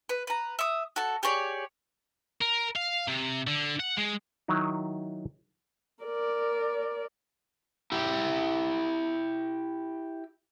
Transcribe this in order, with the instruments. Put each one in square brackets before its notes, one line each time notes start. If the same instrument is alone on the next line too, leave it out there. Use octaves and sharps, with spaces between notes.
[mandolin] B4
B4 A#5
E5 D#6
F#4 A4 A5
G4 G#4 C#5 D5
[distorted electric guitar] A#4
F5
C3
D3
F#5
G#3
[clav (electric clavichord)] D#3 F#3 D#4 E4
[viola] A#4 D5
[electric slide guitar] E4 G4